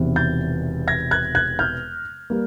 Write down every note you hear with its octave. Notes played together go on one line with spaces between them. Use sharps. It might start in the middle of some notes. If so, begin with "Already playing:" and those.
Already playing: E1 E2 C3 D#3
G6 A6
G#6 A#6
F#6 G#6
F#6 G#6
F6 G6
G3 A#3